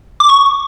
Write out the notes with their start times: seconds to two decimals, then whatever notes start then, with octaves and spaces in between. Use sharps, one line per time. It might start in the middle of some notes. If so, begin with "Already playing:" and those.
0.20 D6
0.29 C#6